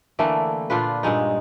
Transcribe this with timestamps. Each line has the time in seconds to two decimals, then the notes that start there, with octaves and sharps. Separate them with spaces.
0.19 D3 E3 A3 A#3
0.70 A#2 D4 F4 B4
1.03 G2 A#2 G#3 D#4